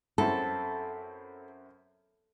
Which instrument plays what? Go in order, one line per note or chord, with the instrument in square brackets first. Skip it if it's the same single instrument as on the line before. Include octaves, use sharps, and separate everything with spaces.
[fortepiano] F#2 C4 E4 [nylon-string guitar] A4